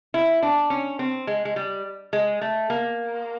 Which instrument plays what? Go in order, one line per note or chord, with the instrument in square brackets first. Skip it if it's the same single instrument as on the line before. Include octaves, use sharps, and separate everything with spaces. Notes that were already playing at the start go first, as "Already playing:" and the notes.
[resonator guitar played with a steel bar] E4
D4
C#4
C4
G#3
G#3
G3
G#3
A3
A#3